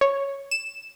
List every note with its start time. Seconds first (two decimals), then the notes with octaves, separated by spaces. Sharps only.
0.01 C#5
0.51 E7